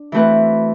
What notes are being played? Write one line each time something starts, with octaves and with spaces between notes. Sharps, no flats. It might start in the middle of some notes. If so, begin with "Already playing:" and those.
Already playing: D4
E3 A3 C4 F#4 B4